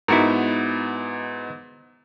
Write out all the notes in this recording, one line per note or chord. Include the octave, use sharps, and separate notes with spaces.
G#2 B3 D#4 E4 F#4 A#4